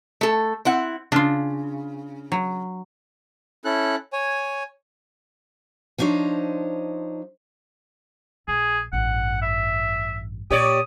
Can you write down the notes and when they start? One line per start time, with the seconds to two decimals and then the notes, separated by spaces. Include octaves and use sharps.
0.21 A3 A4
0.65 C4 E4 F#5
1.12 C#3 D4 F4
2.32 F#3
3.65 C#4 E4 A4 F#6
4.13 C#5 G#5
5.98 F3 D4 D#4 C5 C#5
8.48 A#1 G#4
8.93 A1 G2 F#5
9.42 E5
10.50 A#2 G4 C#5 D5 D#6